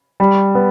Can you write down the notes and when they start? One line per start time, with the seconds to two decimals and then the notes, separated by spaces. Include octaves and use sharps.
0.20 G3
0.55 B3